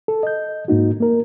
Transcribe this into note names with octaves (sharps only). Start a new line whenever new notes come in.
A4
D#5 G6
G#2 A#3 D#4 F#4
A#3 A#4